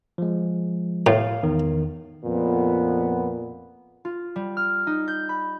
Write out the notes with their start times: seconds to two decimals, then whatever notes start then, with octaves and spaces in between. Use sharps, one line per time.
0.18 F3 G#3
1.06 A2 F5
1.43 E2 D#3
2.24 F2 A#2 B3
4.05 F4
4.36 G3
4.57 F6
4.87 D#4
5.08 G6
5.29 B5